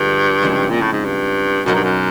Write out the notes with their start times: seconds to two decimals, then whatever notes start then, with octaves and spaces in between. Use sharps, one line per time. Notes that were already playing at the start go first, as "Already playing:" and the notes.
Already playing: G2 D3 F3 G#3
0.42 C#3 F3 G#3 C4 E4
0.70 A#2
0.81 A2
0.92 G#2
1.05 G2
1.66 F#2 B2 F#3 A#3 D#4
1.75 G2
1.84 F#2